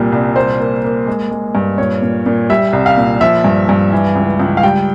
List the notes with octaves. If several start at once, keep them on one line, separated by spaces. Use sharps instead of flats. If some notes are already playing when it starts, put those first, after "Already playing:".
Already playing: C2 A#2 G3
C2
A#3 C5
A#3
A#3
G#3
G#3
G2
A#2 C#5
A#2
A#2
G3 E5
C2
F5
A#2
F3 E5
G2
G2
E3
C#2
C#2
F5
G3 G5